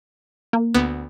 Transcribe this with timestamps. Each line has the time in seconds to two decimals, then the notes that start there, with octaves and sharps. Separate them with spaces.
0.53 A#3
0.74 D2 B3